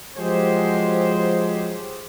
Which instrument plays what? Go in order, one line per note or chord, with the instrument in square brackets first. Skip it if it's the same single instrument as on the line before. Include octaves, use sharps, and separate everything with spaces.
[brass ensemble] F3 F#3 G#3 G4 G#4 C5